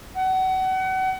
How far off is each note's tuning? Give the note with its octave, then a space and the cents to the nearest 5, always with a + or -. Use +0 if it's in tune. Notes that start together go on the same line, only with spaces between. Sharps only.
F#5 +30